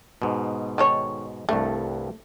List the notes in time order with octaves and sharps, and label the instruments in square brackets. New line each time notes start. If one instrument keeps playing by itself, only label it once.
[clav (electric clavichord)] G#2 B2
[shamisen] D#3 A4 C#5
[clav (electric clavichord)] C2 G2 [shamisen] A3